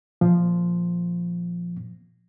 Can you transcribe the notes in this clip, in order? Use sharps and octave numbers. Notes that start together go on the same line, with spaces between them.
A#2 F3